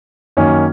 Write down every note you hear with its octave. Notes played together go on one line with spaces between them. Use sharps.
F#2 D#3 A#3 C#4